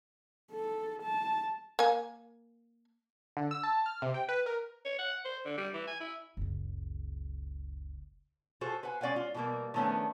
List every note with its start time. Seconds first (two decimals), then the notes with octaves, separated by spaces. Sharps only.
0.51 A4
1.02 A5
1.79 A#3 G#5
3.37 D3
3.51 E6
3.63 A5
3.86 F6
4.02 C3
4.14 G5
4.29 B4
4.46 A#4
4.85 C#5
4.99 F#5
5.25 C5
5.45 D3
5.57 G3
5.74 E3
5.87 G#5
6.00 E4
6.37 F#1 C#2
8.61 F4 F#4 G#4 A4 C5
8.83 B4 C5 F#5 G#5
9.01 G#3 C#4 D5 F5 F#5 G#5
9.16 F4
9.34 B2 E3 G3 G#3 A#3
9.74 D#3 F3 A3 B3 C#4 D4